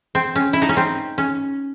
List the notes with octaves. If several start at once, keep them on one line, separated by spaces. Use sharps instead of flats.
C4
C#4
E4
D#4
C#4
C4
C#4